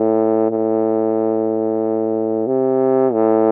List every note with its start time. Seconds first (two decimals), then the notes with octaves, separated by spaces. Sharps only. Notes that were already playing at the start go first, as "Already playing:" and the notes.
Already playing: A2
0.51 A2
2.47 C3
3.13 A2